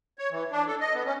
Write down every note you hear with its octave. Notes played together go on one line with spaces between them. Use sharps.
C#5
E3
D4
A4
D#5
B3
C#4